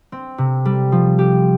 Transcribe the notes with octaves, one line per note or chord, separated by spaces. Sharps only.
C4
C3
G3
F3
G4